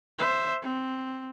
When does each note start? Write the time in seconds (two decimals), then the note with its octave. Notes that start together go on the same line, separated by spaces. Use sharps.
0.18 C5 E5
0.62 C4